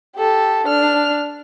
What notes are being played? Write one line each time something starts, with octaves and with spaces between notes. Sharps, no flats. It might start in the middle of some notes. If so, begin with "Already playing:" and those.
G4 A4
D4 F6